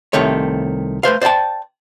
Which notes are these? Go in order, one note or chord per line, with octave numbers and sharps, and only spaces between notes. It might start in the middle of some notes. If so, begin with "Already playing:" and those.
C2 C3 D#3 A3 C#5
A3 B4 C5 F5
C5 D5 F5 G5 A5